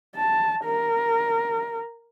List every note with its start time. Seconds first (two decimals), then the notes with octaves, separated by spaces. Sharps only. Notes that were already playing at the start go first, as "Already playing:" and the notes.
0.15 A5
0.65 A#4